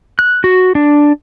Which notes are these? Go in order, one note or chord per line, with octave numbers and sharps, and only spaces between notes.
F#6
F#4
D4